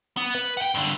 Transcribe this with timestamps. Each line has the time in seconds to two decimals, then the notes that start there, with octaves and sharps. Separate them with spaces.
0.17 B3
0.35 B4
0.57 F#5 G5
0.75 G2 D3